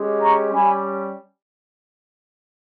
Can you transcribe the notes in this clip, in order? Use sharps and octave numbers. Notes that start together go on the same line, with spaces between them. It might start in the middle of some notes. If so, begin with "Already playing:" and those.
Already playing: G#3 C#4 G4
A#5 C#6
G3 C#4 G4 G#5 B5